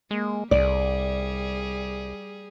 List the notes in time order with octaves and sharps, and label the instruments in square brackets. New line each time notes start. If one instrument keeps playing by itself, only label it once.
[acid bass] G#3 [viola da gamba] A#3
[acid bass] C2 [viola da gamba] G3 G#4 [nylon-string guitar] D5